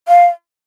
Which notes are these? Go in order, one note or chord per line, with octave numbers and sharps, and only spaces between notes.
F5